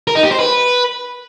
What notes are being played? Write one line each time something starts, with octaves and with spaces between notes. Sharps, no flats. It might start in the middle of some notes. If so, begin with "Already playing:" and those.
A#4
D#4
G4
C5
B4